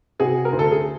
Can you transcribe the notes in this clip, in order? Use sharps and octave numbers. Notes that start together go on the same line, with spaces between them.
C3 F#4 G#4
A#4
D2
A4
G#4